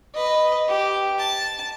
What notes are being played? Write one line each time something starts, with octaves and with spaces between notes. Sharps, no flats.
B4 D#5
G4
A5